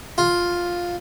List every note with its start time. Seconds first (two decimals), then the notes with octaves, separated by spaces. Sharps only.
0.18 F4